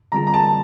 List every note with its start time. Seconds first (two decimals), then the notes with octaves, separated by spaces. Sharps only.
0.12 D3 G3 C4 F4 G#4 A#5
0.27 A#5
0.34 A5